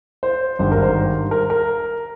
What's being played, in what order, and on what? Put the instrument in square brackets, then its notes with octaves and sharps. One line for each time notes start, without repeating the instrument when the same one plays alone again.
[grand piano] C5
G#1 G2 G3 C5
A#4
C5
A#4
A#4